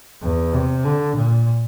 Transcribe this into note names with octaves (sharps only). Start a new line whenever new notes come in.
E2
C3
D3
A#2